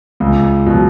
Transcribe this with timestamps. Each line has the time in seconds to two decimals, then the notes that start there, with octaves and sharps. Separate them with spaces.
0.20 C#2
0.66 B2 F#3